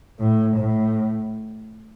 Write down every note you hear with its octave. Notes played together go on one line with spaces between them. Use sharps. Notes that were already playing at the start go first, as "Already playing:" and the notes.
A2
A2